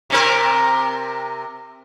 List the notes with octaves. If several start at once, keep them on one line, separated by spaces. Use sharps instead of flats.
C3 C4 A#4